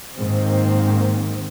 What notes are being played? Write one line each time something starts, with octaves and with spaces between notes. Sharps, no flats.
G#2 D#3 A#3 C4